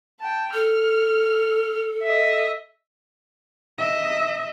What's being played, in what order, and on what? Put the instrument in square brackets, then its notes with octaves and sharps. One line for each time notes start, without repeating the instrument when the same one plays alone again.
[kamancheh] G5 A5
[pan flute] A4 [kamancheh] F6
[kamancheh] D#5 E5
[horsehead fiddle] D#5 E5